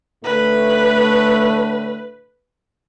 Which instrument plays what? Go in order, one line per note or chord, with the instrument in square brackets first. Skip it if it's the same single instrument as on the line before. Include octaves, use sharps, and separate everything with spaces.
[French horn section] A2 D3 A3 [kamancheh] B4